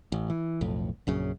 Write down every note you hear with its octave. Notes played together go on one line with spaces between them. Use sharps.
A1
E3
B1 F2 A2
A#1 F#2 C#3